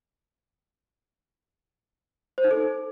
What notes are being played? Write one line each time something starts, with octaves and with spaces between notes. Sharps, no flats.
C5
D#4
A4